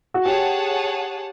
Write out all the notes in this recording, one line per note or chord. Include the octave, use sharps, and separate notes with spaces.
F#4
G4 G#4 C#5 F#5 A5